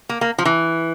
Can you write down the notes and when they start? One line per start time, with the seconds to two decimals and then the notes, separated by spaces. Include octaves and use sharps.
0.09 A#3
0.21 A#3
0.38 F3
0.45 E3